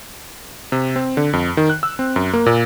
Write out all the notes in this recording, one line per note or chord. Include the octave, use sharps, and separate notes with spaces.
C3
C4
D3
F2
D#3
F#6
E6
C4
F#2
A#3
A#2